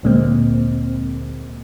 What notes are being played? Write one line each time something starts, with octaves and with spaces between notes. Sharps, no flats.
D2 A#2 G#3 A#3 C4